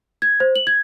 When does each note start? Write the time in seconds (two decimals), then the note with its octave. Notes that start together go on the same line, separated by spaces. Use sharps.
0.22 G#6
0.40 C5
0.56 F#7
0.67 G#6